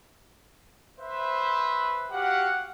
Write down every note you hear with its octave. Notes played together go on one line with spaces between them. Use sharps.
B4 C5 E5
F#4 G4 F5 F#5